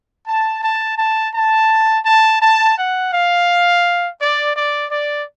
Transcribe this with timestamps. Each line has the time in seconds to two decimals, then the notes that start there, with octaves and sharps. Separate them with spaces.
0.27 A5
0.62 A5
0.98 A5
1.34 A5
2.06 A5
2.42 A5
2.77 F#5
3.12 F5
4.20 D5
4.56 D5
4.91 D5